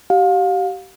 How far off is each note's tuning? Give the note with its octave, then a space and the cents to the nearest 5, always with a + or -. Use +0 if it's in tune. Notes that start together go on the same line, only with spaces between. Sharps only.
G4 -30 F5 +30